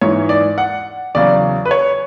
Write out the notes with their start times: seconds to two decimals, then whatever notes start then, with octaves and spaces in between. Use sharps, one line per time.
0.01 G#2 E3 C#5
0.29 D5
0.58 F#5
1.15 E2 C#3 F#3 D5
1.65 B4
1.71 C#5